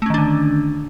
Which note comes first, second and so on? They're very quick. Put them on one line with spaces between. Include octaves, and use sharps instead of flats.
A3 C#4 D#3 D4 D3